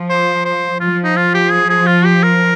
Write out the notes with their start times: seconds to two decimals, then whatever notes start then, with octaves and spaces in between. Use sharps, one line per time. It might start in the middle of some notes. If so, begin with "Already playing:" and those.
Already playing: F3
0.10 C5
0.45 C5
0.80 F3 F4
1.04 D#4
1.16 F4
1.34 G4
1.51 G#4
1.69 G#4
1.86 F4
2.05 G4
2.23 A#4